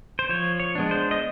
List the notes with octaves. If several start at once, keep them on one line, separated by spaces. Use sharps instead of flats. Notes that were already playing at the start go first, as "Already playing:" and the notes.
C5
F3 C#5
C#5
G#3 B3 D4
C5
D#5